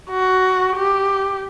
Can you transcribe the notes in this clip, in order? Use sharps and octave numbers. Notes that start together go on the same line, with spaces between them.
F#4
G4